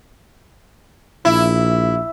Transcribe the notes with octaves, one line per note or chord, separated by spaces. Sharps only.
A#1 E4